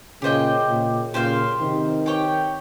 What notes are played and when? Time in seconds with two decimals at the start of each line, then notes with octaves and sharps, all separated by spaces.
0.22 A#2 C#3 G4 C5 D#5 G5
0.68 A#2 C#3
1.14 A#2 C#3 G4 C5 F5
1.60 C3 D#3
2.06 G4 C#5 G5